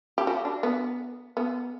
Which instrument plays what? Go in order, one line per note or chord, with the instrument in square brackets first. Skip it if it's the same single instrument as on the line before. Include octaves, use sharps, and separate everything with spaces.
[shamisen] G4
F#4
D4
B3
B3